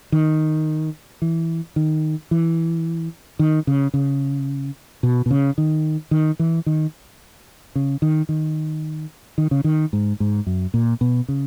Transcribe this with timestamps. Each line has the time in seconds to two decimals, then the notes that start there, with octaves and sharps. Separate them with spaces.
0.12 D#3
1.22 E3
1.76 D#3
2.31 E3
3.39 D#3
3.67 C#3
3.94 C#3
5.03 B2
5.26 B2
5.31 C#3
5.58 D#3
6.11 D#3
6.39 E3
6.66 D#3
7.75 C#3
8.02 D#3
8.29 D#3
9.38 D#3
9.51 C#3
9.64 D#3
9.93 G#2
10.20 G#2
10.46 F#2
10.74 A#2
11.01 B2
11.28 C#3